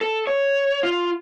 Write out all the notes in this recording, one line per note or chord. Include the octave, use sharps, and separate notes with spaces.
A4
C#5
F4